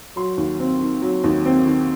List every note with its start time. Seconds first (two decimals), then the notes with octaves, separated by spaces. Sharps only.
0.16 F#3 C6
0.38 D#2
0.60 C4
0.81 D#3
1.02 F#3
1.24 D#2
1.45 C4
1.66 D#3